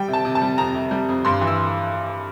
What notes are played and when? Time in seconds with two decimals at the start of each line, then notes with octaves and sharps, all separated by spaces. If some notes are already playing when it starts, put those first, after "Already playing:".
Already playing: G3 G5
0.08 C3
0.13 A5
0.25 C3
0.35 A5
0.42 G3
0.58 F2 A#5
0.75 C3
0.91 G3
1.09 F2
1.25 G2 C6
1.41 E3
1.47 E6